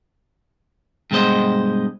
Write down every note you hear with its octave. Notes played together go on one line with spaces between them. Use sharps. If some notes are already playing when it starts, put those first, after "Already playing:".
G2 B2 G#3 C5 D#5